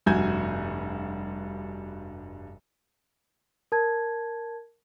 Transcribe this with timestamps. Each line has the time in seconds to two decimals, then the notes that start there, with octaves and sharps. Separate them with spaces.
0.06 F1 G2 F#4 G#5 G6 G#6
3.72 A#4 A5 G#6